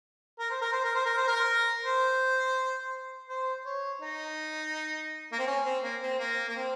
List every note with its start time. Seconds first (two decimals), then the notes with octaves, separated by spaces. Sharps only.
0.39 A#4
0.50 C5
0.62 A#4
0.72 C5
0.84 A#4
0.95 C5
1.05 A#4
1.17 C5
1.28 A#4
1.85 C5
3.29 C5
3.66 C#5
4.02 D#4
5.32 A#3
5.39 C4
5.47 C#4
5.65 C4
5.83 A#3
6.02 C4
6.19 A#3
6.49 A#3
6.56 C4